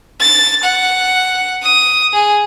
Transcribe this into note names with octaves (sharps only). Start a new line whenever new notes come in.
A6
F#5
D#6
G#4